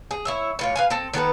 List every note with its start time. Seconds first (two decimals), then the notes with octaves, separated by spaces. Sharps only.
0.11 G#4
0.25 E4 C#5 E5
0.59 A2 F4 C#5
0.76 B4 F5 G#5
0.90 C4 A4
1.14 D#3 B3 A4 B4